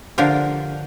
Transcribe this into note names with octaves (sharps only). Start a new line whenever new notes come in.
D3 F3 D4 F4 G4 A#4